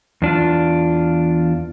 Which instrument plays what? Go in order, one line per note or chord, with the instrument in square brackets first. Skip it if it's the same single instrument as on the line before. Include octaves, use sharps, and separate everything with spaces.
[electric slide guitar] E2 D4 F4